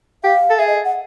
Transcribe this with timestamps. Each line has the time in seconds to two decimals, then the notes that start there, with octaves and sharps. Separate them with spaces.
0.24 G4 F5
0.50 A4
0.59 G#4 E5
0.67 D#5
0.84 F#5